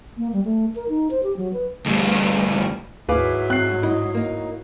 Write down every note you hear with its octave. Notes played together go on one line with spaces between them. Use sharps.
A#3
G3
A3
A#4
D#4
C5
G4
F#3
B4
D2 G2
D#2 G#2 F#3 E4 G#4 B4 F5 D6
C4 F#6 C7
E4 D#5
A#3 D#4